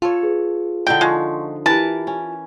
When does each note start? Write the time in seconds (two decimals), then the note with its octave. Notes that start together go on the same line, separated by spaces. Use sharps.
0.02 F4 A4 C#5
0.23 G#4 B4
0.87 D3 D#4 E4 G5
1.01 F3 G#3 C6 C#6
1.66 E3 E4 G4 A#4 B4 A5
2.07 C#4